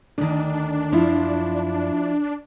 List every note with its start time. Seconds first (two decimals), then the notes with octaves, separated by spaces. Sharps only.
0.18 D2 D#3 D4
0.92 F#2 F3 E4 F4